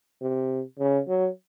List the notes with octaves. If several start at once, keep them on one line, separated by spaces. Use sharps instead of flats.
C3
C#3
F#3